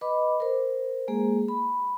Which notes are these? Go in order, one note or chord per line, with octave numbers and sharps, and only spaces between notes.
B4 D#5 B5 D6
A#4 C5
G#3 A#3 G#4
B5